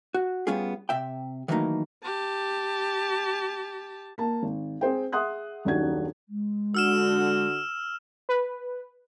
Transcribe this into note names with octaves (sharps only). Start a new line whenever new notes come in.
F#4
G3 B3 C#4 F4 G#4
C3 E5 G5
D#3 E3 F#3 A3 A#3 D#4
G4 A5
A#3 A5
G#1
C4 G#4 C5 G5
G#4 E5 F#5 C6 D#6 F#6
D#1 F#2 D#3 D4 F#4 G#6
G#3
D3 F#4 E6 F6 E7
B4